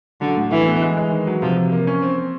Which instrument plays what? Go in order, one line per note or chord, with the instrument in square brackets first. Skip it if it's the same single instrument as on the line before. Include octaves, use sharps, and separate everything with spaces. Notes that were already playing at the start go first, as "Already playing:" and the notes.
[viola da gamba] D3 [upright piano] F#3
[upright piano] A2
[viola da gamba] E3 [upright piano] E4
[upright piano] B3
G#3
G#3
D#3
F#3
[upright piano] C3 [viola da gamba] F3
[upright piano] C3
A#3
C#4
C4
C4